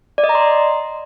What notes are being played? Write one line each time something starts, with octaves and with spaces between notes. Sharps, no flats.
D5
D#5
A#5
C6